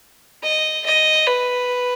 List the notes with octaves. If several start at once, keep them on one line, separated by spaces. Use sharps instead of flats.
D#5
D#5
B4